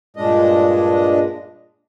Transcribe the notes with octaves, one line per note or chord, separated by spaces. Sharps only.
G2 A#2 G#3 D4 D#5